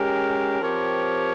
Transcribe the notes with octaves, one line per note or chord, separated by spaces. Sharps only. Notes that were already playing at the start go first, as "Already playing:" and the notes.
Already playing: G#3 C#4 G4 A#4
F3 C4 G4 A#4 C#5